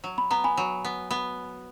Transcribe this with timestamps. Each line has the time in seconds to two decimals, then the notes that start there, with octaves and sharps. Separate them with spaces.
0.04 F#3
0.18 B5
0.31 B3 A#5
0.44 G#5 B5
0.57 F#3
0.85 B3
1.11 B3